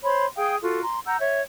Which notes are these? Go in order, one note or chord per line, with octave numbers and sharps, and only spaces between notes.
C5 C#5 B5 C6
G#4 F5 G5 D#6
F4 F#4 A4
A#5 C6
F#5 A#5 E6 G6
C#5 E5